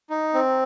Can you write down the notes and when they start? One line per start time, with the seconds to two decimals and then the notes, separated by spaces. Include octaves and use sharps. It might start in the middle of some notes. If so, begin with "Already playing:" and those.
0.10 D#4
0.34 C4